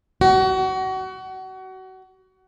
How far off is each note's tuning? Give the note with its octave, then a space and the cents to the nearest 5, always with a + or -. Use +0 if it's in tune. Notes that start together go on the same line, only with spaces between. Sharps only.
F#4 +30